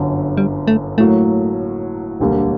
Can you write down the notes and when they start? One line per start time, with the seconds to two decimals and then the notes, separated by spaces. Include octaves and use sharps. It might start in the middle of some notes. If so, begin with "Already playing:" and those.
Already playing: G1 F#2 D3
0.37 G3
0.67 A3
0.98 A2 F#3 A3 A#3
2.19 E1 D2 D3 G3 A#3